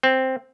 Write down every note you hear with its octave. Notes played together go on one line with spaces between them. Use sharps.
C4